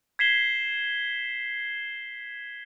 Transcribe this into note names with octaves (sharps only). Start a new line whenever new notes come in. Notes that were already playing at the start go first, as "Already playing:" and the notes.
G#6 B6 C7 E7 G7